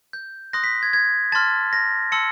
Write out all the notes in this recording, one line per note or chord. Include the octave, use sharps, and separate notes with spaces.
G6
C6 D#6 F#6 A#6
B6
G#6
G#6
A5 C6 F6 A6
A#6
A5 C6 E6 C#7